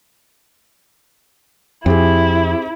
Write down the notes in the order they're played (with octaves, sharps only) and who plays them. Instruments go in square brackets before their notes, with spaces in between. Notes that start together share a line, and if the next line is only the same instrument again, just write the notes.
[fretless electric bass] F2 [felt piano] C4 G4 G#4 [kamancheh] E4